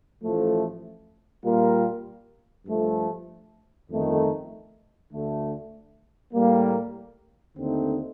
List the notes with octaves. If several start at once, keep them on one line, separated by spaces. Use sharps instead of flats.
A1 A2 F3 A3
A#2 G3 A#3 F4 A#4
G2 F3 A3
G1 F2 D#3 A3 D#4
D2 D3 A3
A2 G3 A#3
D#2 D3 A3 C4 D#4